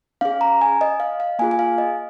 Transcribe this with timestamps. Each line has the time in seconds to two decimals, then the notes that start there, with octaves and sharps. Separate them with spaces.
0.21 C#4 G#4 F5
0.41 A#5
0.61 G#5
0.81 D#5
1.00 F5
1.20 F5
1.39 A#3 F4 G#4 G#5
1.51 G#5
1.59 F5
1.78 D#5